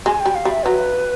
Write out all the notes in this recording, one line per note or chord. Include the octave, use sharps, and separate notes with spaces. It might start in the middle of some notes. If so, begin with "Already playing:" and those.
G#3 G#5
G5
G3
F5
G3
E5
F#3 B4